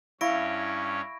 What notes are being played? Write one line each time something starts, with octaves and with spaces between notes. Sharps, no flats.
G2 C#4 E4 C#5 F5 C#6 A#6 D7